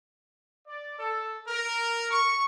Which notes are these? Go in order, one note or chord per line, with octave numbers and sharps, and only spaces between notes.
D5
A4
A#4
C#6